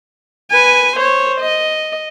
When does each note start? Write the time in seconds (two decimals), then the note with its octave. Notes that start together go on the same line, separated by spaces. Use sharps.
0.51 B4 G#5
0.96 C5 C#5
1.41 D#5